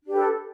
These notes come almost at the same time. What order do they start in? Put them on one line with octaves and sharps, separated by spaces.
D4 G4 B4 A4